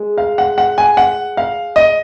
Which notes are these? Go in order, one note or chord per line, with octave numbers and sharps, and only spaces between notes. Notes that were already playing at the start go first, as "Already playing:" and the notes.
Already playing: G#3
F5
F#5
F#5
G#5
F#5
F5
D#5